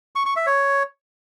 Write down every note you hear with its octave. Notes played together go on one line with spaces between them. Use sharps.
C#6
C#6
E5
C#5